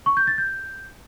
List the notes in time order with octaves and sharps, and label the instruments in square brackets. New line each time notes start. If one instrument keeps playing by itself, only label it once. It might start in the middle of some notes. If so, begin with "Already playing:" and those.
[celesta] C#6
G6
A6
G6